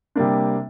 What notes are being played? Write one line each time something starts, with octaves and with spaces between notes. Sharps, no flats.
C3 G3 A#3 D4